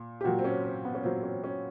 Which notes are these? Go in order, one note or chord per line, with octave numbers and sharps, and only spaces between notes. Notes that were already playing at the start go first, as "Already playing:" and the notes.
Already playing: A#2
G4
A#2 F#3 F#4
C4
C#4
C4
B3
C#4
A#2 F#3 C4
C#4
C#4